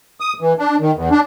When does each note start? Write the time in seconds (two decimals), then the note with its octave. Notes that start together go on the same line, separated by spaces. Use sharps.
0.20 D#6
0.41 E3
0.59 D4
0.80 D#3
0.95 E2
1.11 D4